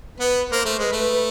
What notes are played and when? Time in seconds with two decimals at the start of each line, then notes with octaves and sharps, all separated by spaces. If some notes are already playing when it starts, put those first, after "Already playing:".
0.20 B3 B4
0.52 A#3 C5
0.65 A3
0.79 G#3
0.84 B4
0.92 A3